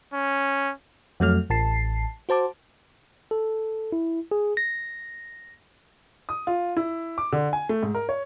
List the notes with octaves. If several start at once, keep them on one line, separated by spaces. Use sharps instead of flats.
C#4
F2 F#3 A3 F6
A1 A5 C7
F#4 C5 A5 D6
A4
E4
G#4
A#6
D#6
F4
E4
D6
D3
G#5
A3
G#2
A#4
C#5